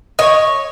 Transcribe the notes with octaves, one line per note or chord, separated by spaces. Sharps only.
C#5 D#5